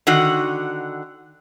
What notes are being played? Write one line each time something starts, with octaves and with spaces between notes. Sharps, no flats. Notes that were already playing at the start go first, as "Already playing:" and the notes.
D3 D#3 F#4